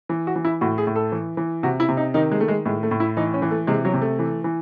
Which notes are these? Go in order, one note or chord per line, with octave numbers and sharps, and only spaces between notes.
E3
F#4
E3
E4
A2 F#4
G#4
A2
A4
E3
E3
C3 F#4
E4
C3
D#4
D#3 D#4
G#3
D#3 A3
G#3
A2 G#3
A3
A2
E4
E3 D#4
C#4
E3
A3
C3 G#3
F#3
C3
A3
E3
E3